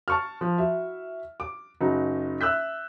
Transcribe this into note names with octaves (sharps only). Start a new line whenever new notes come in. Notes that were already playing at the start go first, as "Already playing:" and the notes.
A5 C#6 F6
F3
E4 F#4 E5
D6
F#1 D#4 F#4
E5 E6 F#6 G6 B6